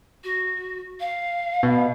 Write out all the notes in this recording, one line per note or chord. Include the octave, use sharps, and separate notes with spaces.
F#4
F5
B2